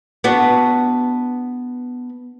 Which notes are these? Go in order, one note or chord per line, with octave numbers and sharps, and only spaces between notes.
B3 D4 F#4